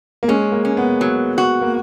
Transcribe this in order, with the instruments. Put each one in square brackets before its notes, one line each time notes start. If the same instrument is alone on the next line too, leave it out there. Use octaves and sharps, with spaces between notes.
[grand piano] A#3
[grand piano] G#3 [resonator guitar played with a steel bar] C#4
[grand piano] A#3
[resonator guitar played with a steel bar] C#4
[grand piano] B3
[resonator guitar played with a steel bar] F#3
F#4
[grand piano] A#3